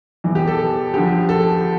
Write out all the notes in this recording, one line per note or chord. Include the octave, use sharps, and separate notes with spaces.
E1 E2 E3
G4
A4
D2 D3 F3 G4
A4